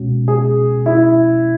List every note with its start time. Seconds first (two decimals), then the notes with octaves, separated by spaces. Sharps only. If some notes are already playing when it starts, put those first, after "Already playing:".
Already playing: C#2 B2 G#3 C#4 F#4
0.28 G#4
0.86 E4